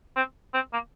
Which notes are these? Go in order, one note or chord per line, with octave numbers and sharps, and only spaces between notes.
C4
C4
A#3